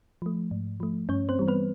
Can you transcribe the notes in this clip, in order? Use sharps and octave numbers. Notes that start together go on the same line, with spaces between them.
F3 A3
G#2
F3 A3
G2 C#4 C#5
C4 C5
E3 G3
B3 B4